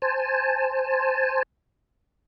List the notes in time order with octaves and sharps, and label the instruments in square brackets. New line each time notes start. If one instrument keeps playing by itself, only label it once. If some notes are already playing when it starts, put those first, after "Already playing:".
[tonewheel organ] C5 G#5 A5